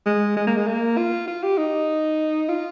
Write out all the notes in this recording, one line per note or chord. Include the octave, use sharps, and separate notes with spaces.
G#3
G#3
A#3
G#3
A#3
F4
F4
G4
D#4
F4